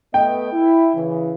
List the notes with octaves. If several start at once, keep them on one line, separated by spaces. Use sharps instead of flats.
A3 B3 D#5 G5
E4
C#3 E3